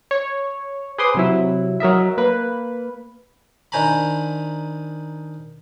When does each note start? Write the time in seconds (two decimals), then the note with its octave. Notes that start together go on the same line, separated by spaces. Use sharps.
0.11 C#5
0.98 G#4 B4 C5 C6 D6 D#6
1.14 C3 F#3 E4
1.80 F#3 A#4 D#5 E5
2.18 A#3 B4
3.72 D#3 D4 C5 G#5 A#5 B5